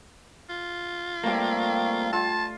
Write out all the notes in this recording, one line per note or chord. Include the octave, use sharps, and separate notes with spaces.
F4
G3 A3 A#3 C4
F4 A5